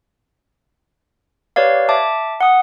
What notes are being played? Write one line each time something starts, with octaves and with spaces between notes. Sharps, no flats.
G4 B4 C#5 D5 F5
E5 A5 D6
F#5 D#6